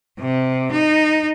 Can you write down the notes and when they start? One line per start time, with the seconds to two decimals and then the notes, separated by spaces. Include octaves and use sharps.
0.20 C3
0.72 D#4